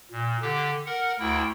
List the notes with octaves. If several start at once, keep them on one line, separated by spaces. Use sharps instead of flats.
A#2
D3 G4
A#4 F#5
D2 E4 G5